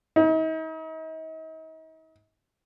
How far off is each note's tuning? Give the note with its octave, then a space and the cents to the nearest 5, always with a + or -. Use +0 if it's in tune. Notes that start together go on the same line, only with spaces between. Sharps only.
D#4 +40